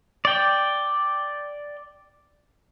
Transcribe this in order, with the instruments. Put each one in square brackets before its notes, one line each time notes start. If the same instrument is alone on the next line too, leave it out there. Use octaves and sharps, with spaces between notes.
[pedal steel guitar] D5 G5